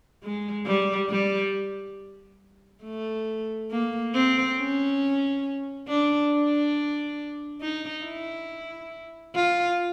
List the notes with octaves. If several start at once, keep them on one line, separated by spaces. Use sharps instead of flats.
G#3
G3
G3
A3
A#3
C4
C#4
D4
D4
D#4
E4
F4